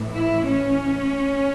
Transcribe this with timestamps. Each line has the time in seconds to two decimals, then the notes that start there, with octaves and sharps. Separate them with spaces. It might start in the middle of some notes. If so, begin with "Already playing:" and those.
Already playing: A2 E3
0.14 E4
0.47 C#4